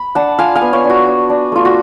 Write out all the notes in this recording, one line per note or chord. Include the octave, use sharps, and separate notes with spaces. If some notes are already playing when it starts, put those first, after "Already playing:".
Already playing: B5
D4 F#5 A5
F4 F5 G#5
F5 G#5
B3
C#5 F5
D4
F#4
D4
D4
A3 F4
F#4